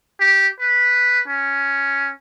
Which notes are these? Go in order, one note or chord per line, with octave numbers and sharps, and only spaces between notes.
G4
B4
C#4